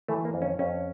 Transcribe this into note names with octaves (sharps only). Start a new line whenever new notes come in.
E3 A3
A#3
F2
C#4
F2 C#4